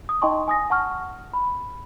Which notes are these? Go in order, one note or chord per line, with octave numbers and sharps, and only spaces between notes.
D#6
D#4 D#5 G5 A5 C6 C#6
G#5 D#6 A#6
F#5 A5 C#6 F6
B5